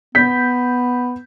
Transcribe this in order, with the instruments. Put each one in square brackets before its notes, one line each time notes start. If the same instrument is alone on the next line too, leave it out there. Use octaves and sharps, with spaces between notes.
[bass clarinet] B3 [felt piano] G6 B6